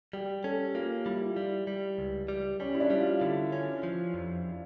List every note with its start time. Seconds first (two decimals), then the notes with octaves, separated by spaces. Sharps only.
0.13 G3 G4
0.44 C#4 A4
0.75 A#3 F4
1.06 G3 E4
1.17 F4
1.27 E4
1.36 G3
1.67 G3
1.98 C#2
2.28 G3
2.60 G3 C#4
2.75 E4
2.80 D4
2.90 G3
3.00 F4
3.21 D3 E4
3.52 C#4
3.83 F3
4.14 F2